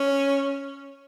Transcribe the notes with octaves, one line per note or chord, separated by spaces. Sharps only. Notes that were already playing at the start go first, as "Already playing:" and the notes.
Already playing: C#4